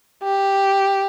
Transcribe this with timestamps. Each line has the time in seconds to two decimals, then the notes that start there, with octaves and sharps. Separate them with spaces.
0.23 G4